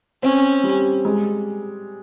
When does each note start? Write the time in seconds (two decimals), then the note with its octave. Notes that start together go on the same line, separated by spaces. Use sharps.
0.23 C4 C#4
0.63 G3
1.05 G#3